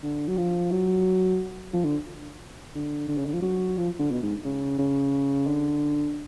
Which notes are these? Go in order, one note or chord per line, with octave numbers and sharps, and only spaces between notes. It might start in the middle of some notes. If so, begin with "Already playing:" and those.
D3
F#3
F3
F#3
F3
D3
D3
D3
C#3
D3
F3
F#3
F3
D3
B2
G#2
C#3
C#3
D3